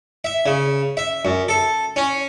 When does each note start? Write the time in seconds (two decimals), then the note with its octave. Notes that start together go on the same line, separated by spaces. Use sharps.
0.24 E5
0.46 C#3
0.97 E5
1.25 F#2
1.49 A4
1.96 C#4